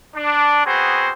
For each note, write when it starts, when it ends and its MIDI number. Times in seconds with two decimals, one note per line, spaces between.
0.16 0.65 62
0.66 1.12 59
0.66 1.12 60
0.66 1.12 66
0.66 1.12 68
0.66 1.12 72